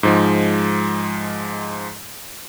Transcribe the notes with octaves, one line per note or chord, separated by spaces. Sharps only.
G#2 F3 G#3